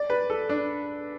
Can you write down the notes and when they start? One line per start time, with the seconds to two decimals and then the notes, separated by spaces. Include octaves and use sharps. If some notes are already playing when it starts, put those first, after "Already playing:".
Already playing: D5
0.10 B4
0.30 A4
0.49 D4